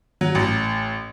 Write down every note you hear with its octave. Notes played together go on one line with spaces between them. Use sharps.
F#3
A1